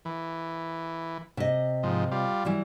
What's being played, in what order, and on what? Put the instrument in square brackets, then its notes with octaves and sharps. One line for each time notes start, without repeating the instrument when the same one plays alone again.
[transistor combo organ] E3
[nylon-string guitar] C3 D#5
[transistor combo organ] G#2 F3
G3 F4
[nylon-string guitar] E3 F#3 G3